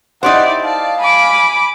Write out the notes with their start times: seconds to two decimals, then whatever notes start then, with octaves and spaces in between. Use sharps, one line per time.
0.23 D#4 E4 G4 C5 D5 F#5
0.64 D5 F5 A5
1.01 G#5 B5 D6